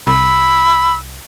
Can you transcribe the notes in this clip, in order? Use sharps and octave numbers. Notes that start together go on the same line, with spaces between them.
C2 B5 E6